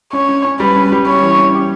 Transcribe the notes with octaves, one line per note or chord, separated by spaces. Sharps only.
C#4 C#5
C#4
C#4
G3 B4
C#4
G3
C#4 C#5
E3
C#4
G4